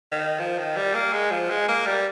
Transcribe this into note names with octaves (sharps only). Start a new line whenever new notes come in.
D#3
F3
D#3
G3
A#3
G#3
F3
G#3
A#3
G3